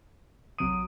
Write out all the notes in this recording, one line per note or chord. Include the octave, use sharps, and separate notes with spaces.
A1 F#3 D#6 D7 D#7